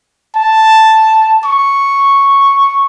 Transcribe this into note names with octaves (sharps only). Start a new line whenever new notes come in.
A5
C#6